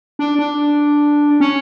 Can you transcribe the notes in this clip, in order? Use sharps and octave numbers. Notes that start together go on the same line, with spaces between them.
D4
D4
C#4